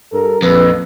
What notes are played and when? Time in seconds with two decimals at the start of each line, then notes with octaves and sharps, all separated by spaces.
0.13 G2 A4 A#4
0.42 A#1 F2 B4